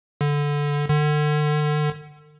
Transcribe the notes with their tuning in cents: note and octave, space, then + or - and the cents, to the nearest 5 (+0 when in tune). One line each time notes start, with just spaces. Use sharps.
D3 -10
D3 +35